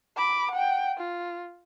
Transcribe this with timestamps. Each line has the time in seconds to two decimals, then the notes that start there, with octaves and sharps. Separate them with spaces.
0.16 B5 D6
0.51 F#5 G5
0.98 F4